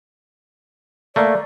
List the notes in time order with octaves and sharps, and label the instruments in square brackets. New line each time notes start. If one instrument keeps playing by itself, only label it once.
[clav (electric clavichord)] A3 A#3 [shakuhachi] D5